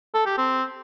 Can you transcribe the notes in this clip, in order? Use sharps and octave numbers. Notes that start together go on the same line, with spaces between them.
A4
G4
C4